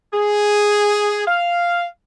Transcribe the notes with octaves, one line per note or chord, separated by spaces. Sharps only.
G#4
F5